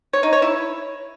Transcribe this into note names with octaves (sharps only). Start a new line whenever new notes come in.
C#5
D#4
C#5
E4